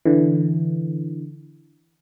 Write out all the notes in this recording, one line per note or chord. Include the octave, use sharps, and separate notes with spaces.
D3 E3